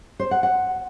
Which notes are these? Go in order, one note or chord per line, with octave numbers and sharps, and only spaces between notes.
C5
F#5
F#5